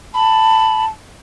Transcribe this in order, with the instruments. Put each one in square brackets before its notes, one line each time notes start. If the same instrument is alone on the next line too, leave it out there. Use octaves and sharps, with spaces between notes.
[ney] A5 [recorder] B5